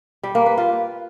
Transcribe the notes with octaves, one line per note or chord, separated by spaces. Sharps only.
G3
A#3
B4
F4